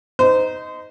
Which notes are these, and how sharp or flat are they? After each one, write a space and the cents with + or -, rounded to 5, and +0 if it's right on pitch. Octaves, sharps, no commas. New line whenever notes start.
D#4 +5 C5 -30